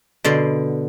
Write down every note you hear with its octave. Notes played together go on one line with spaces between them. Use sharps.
B2 D3 D5 C6